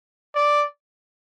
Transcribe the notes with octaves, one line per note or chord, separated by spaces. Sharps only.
D5